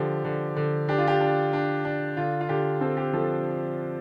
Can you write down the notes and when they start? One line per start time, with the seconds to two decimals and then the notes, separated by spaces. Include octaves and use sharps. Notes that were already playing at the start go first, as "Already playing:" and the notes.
Already playing: D3 F3 G4
0.25 D3
0.56 D3
0.88 D4 G4
0.98 F4
1.07 G4
1.21 D4
1.53 D4
1.85 D4
2.17 D3 F4
2.41 F4
2.49 D3 G4
2.81 C4 A4
2.97 G4
3.13 F3 A4